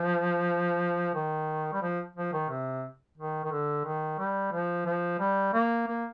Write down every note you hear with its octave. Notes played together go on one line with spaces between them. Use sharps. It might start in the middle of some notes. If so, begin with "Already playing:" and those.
Already playing: F3
D#3
G3
F3
F3
D#3
C3
D#3
D#3
D3
D#3
G3
F3
F3
G3
A#3
A#3